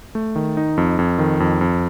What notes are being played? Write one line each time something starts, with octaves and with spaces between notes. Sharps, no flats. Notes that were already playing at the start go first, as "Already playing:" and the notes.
A3
D#3
D#4
F2
F2
D#3
F2
F2